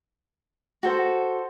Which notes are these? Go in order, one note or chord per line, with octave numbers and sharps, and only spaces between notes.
F#4 A4 C5